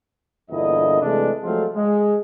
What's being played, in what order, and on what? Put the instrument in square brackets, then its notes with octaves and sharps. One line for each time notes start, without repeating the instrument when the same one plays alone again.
[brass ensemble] G1 E2 A#2 D3 E4 D#5
C3 E3 G#3 A3 D4
F3 F#3 G#3 A3 C4 F4
G#3